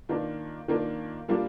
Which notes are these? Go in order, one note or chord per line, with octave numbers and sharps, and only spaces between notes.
D#3 A#3 D4 F4
D#3 A#3 D4 F4
A#2 G3 A#3 D4 F4